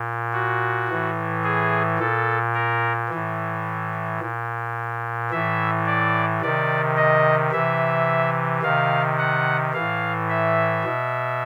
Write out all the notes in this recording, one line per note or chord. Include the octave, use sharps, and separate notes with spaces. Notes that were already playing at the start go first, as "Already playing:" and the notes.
Already playing: A#2
F#4
A2 E3
G#4
A#2 A4
A#4
E3
A2
A#2
A2 E3 E5
D5
C3 D#3 D5
D#5
C3 E3 E5
C3 D#3 F5
F#5
A2 E3 F5
E5
B2